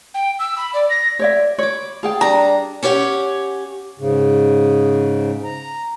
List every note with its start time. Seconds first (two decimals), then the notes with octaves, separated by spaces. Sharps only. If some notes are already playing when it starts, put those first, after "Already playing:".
0.14 G5
0.39 E6
0.58 B5
0.74 D5
0.90 A#6
1.19 C#5 D5 E5
1.58 C#5 B5 D6
2.03 G#4 F5 G5 A5
2.21 G3 D4 A#5
2.83 C#4 G4 C#5 F#5
4.00 G#2 C#3
5.44 A#5